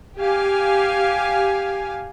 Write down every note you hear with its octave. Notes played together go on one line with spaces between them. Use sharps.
G4 F5 G#5